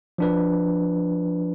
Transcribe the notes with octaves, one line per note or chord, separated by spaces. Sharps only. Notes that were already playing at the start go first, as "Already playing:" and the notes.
F3 D4 B4